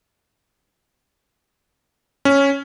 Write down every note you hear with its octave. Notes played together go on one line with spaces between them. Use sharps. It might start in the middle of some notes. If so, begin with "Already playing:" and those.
C#4